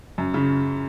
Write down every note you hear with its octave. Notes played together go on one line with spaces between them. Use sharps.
F#2
C#3